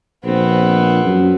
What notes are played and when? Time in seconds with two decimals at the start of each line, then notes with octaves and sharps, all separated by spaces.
0.25 A#1 B3 C4
1.05 F#2